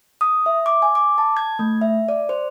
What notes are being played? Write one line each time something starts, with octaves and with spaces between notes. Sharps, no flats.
D#6
E5
D6
G#5
D6
A5
G#6
A3
E5
D5
C5